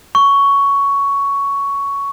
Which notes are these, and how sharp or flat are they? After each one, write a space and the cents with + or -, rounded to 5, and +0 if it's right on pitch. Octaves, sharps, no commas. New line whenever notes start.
C#6 +10